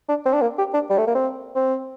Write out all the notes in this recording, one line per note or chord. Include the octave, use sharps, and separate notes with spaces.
D4
C4
D4
A#3
G4
D4
G3
A3
A#3
C4
C4